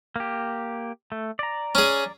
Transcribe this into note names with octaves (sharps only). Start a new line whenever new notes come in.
A#3 G4
A3
D5 A#5
C#4 G#4